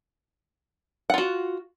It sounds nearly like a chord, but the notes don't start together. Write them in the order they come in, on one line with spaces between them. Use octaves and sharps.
F#5 F4 F#4